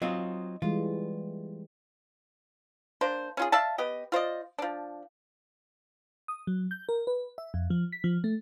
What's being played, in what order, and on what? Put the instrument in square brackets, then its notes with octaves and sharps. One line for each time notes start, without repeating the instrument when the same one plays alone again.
[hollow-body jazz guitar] F#3 C4 F4 [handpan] D#5
[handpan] E3 G3 G#3 [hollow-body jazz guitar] F4
[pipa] A#3 D4 C5
C#4 F4 G#4
D5 E5 F5 A5
B3 G4 D#5
F4 C5 D5 D#5
F3 D4
[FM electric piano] D#6
F#3
G6
A#4
B4
E5
F2
F3
B6
F3
A3